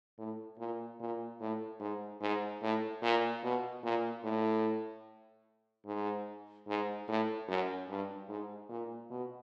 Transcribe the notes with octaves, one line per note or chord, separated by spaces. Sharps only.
A2
A#2
A#2
A2
G#2
G#2
A2
A#2
B2
A#2
A2
G#2
G#2
A2
F#2
G2
G#2
A#2
B2